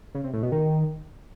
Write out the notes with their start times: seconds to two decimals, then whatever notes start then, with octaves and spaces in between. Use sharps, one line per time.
0.15 C#3
0.24 C3
0.33 A2
0.43 B2
0.52 D#3